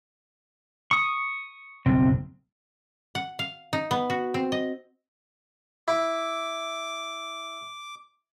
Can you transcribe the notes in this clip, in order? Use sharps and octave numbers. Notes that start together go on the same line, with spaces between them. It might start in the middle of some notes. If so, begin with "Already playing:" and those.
C#6 D#6
F#1 B1 C4
F#5
F5
D#4
B3
F#4
C4
D#5
E4 D6